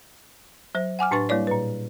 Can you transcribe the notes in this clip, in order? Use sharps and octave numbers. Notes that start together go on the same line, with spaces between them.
F#3 C5
F#5 G#5 D6 F6
A2 D4 B4 C#6 A6
G3 A#3 E4 C#5 D5
A#2 B4